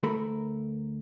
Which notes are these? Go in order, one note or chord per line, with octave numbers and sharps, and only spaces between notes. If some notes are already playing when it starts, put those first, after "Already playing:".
D2 A3 A4 A#4 A#5 B5